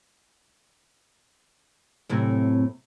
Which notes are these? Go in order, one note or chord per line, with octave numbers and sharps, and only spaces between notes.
F#2 A2 C3